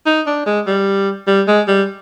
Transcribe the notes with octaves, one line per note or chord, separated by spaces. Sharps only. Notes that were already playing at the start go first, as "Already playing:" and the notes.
D#4
D4
G#3
G3
G3
G#3
G3